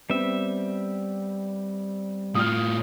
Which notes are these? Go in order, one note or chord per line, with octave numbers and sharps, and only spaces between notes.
G3 B3 C4 E5
A2 F4 D#6 F6